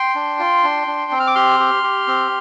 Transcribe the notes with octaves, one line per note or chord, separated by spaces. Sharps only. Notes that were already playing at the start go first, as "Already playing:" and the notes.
Already playing: G5 C6
D4
F4
D4
D4
C4
F6
D6
G4 C6 F6
G4
G4
C4